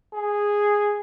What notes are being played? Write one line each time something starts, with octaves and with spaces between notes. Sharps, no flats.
G#4